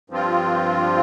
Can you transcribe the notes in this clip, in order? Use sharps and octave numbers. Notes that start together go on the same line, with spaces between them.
G2 F3 C4 F4